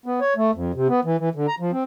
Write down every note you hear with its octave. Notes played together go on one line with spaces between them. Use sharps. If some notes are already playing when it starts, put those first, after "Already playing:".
B3
C#5
A3
F2
C3
B3
E3
E3
D3
A#5
F3
C4